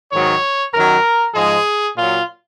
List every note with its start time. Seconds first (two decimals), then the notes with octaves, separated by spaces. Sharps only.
0.13 G#2 D#3 F#3 C#5
0.74 F#2 D#3 F#3 A#4
1.35 G#2 F3 G#3 G#4
1.96 A#2 F#3 F4